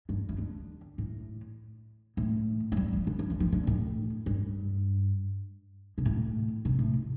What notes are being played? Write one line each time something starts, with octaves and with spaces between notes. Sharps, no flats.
G2
F2
D3
A2
A2
F3
G3
F3
D3
F3
D3
F3
D3
A2
G2
C3
A2
C3
A2